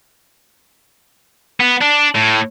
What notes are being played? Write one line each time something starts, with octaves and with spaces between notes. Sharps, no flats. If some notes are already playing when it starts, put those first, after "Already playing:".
B3
D4
A2